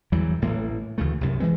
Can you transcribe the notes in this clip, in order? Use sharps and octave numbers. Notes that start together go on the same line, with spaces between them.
E2 E3 F#3 G3
A1 A2 A3 A#3
D2 C#3 E3 A3
C2 F#2 C3
E3 G#3 C4